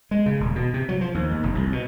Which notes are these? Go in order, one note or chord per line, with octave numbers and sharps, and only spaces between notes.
G#3
C#3
D#1
B2
C3
F#3
F3
D#2
D#2
F1
C2
B2